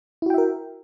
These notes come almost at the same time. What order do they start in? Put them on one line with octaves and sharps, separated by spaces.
E4 F#4 G5 E5 A#4